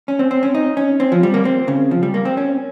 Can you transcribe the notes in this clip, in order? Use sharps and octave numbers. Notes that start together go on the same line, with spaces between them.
C#4
C4
C4
C#4
D#4
C#4
C4
F3
G3
A#3
C4
C#3
F3
G3
A#3
C4
C#4